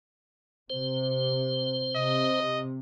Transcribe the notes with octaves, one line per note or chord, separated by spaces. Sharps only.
C3 C5
C3 D#5